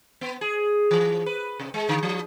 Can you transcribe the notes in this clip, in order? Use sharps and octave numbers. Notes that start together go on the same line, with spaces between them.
B3
G#4
E3
B4
C3
G#3
D3
F3